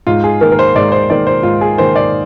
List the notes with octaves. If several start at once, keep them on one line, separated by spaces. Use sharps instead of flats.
G#2 F4
G#4
D#3 A#3 A#4
A#4
C5
G#2 D5
C5
D#3 A#3 D5
C5
G#2 F4
G#4
D#3 A#3 C5
D5